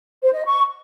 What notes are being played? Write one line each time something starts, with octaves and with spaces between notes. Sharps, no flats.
C5
D#5
C#6